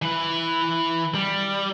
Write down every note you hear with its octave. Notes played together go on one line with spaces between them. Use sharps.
E3 B4
G3